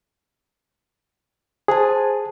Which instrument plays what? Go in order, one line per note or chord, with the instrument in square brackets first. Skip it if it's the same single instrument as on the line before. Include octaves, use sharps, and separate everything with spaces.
[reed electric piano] G#4 [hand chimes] C5 G#5 A5